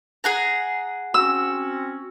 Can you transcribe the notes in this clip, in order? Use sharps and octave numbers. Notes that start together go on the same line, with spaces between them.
G#4 F#5 A#5
C4 C#4 F#4 E6